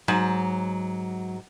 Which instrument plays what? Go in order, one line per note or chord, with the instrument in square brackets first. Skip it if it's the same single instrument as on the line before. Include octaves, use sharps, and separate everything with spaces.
[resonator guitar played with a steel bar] G#2 [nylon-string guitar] F#3